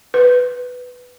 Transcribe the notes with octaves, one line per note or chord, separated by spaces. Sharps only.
B4